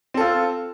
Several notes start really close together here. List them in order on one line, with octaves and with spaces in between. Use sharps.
C4 A4 F4